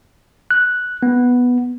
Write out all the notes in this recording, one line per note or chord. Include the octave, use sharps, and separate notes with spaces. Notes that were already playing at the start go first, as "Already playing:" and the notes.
F#6
B3